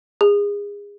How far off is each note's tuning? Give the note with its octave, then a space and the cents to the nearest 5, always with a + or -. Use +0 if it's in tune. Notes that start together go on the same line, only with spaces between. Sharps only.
G#4 -30